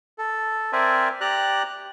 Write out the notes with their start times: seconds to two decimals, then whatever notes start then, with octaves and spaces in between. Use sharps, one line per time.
0.18 A4
0.73 C4 A#4 C5 D5 E5 G#5
1.21 G4 D5 A#5 F#6